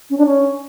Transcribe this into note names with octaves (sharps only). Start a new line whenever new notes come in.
C#4
D4
C#4